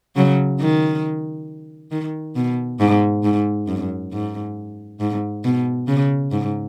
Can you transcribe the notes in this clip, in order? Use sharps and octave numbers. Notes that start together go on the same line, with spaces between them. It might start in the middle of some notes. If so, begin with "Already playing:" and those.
C#3 F#3
D#3
D#3
B2
G#2
G#2
F#2
G#2
G#2
B2
C#3
G#2